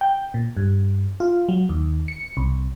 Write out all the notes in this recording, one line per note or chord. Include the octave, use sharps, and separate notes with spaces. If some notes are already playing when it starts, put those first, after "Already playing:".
G5
A#2
G2
F4
F#3
D#2
C#7
C2